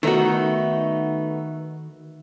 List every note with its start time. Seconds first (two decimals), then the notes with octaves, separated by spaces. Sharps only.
0.03 D#3 A3 B3 D#4 F#4